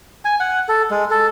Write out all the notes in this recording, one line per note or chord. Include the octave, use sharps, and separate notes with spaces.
G#5
F#5
A4
G#3
A4